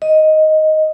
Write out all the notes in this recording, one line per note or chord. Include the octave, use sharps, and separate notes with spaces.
D#5